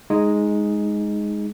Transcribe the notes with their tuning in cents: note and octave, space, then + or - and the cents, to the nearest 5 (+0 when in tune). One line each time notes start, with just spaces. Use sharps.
G#3 +0 D#4 +0